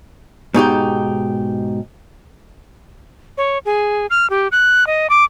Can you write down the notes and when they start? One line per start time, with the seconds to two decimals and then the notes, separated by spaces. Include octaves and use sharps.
0.54 G#2 B2 D#4 G4
3.37 C#5
3.65 G#4
4.10 F6
4.30 G4
4.52 F#6
4.87 D#5
5.10 D6